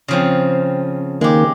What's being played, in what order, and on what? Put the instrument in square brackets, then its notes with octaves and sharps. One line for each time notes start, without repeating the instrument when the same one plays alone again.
[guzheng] C#3 F3 C4
[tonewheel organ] D#3 A#3 [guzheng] G#3 G4